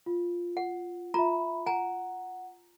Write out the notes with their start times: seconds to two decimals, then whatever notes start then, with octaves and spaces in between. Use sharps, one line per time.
0.06 F4
0.57 F#5
1.14 F4 E5 A#5 B5
1.66 F#5 G#5 A#5